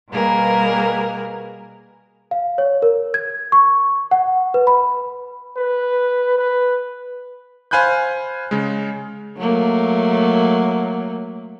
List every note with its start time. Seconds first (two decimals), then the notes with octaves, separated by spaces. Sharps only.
0.10 B2 G3 A#3 G#4 A#4 B4
2.31 F5
2.58 C#5
2.82 A#4
3.14 G#6
3.52 C#6
4.11 F#5
4.54 B4
4.67 B5
5.57 B4
6.38 B4
7.71 C5 F5 G#5 B5 F#6 G6
8.51 C#3 G#3
9.37 F#3 A3 A#3